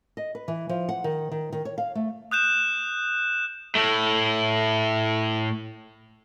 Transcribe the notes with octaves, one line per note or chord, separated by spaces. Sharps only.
D#5
B4
E3
F3
F#5
D#3
D#3
D#3
C#5
F5
A3
D#6 F#6 G6 E7
A2 A3